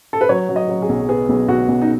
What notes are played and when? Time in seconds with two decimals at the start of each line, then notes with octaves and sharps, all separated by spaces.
0.13 A4
0.21 B4
0.29 F#3 C#5
0.49 F#3
0.56 D#5
0.69 F#3
0.82 G#4
0.89 B1
1.09 B3 G#4
1.29 B1
1.48 B1 F#4
1.68 B1
1.82 D#4